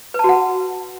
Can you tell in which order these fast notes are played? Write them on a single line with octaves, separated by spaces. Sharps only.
B4 A5 F#4 F#5